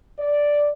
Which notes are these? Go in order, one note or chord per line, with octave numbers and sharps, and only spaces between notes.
D5